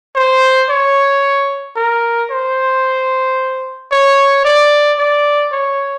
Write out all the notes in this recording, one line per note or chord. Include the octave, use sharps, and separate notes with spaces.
C5
C#5
A#4
C5
C#5
D5
D5
C#5